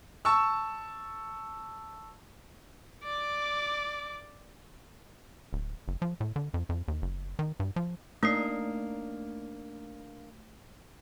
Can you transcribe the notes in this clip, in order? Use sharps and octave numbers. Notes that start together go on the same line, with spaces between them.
A5 C#6 E6
D5 D6
D1
F#1
F3
A2
D3
F2
F2
D#2
F#1
D#3
G2
F3
A3 A#3 D4 D#4 D#6 C7